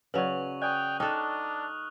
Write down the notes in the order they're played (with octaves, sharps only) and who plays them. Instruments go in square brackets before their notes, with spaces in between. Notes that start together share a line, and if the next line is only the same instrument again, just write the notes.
[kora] C#3 F#3 [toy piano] B4 D5 [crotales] C#6 F7 F#7
[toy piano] D5 G#5 [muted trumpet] G5 [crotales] C#6 D#6 F#6
[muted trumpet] D4 [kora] D#4 A4 [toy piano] G5 [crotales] F6 F#6